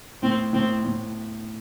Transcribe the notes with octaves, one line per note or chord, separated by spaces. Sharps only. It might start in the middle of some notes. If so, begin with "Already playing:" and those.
A2 C4
A2 C4
A2